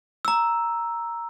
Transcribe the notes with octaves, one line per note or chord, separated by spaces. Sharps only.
A#5 E6